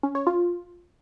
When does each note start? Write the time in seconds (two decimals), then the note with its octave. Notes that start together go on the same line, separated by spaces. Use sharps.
0.03 C#4
0.15 C#5
0.27 F4